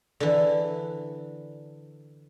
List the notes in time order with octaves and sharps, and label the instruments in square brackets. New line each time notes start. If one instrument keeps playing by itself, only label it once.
[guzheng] D3 E3